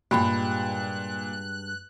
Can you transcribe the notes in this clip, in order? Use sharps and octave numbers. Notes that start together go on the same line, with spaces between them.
G2 A#2 G#3 G4 G5 B5 F#6